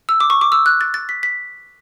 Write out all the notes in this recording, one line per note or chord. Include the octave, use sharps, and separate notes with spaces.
E6
D6
C#6
D6
E6
F#6
A6
A6
B6
B6